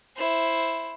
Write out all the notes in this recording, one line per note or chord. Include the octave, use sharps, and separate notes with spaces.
E4 C5